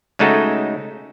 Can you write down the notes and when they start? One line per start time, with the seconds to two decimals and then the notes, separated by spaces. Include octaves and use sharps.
0.19 C#3 G#3 A3 D#4 F#4 A4